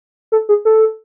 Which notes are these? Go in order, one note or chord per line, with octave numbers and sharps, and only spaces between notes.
A4
G#4
A4